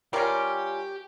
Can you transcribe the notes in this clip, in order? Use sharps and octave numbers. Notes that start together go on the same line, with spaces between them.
G3 C#4 F4 G4 A#4 D6